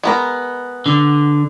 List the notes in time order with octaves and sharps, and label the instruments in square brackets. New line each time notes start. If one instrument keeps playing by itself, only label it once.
[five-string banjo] G#3 B3 A#4
[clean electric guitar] D3